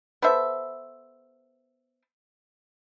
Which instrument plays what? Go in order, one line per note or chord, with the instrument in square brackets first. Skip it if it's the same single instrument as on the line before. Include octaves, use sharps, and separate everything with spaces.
[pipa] B3 A4 C5 E5